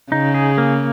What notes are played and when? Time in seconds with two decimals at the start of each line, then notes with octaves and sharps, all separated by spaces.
0.12 C#3 D#4
0.34 G#4
0.58 A#3